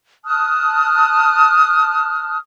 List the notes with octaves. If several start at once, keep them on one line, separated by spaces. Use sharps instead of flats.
A5 D#6 F6 F#6